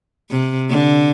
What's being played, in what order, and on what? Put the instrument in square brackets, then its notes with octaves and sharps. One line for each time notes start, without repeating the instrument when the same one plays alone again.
[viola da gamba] C3
D3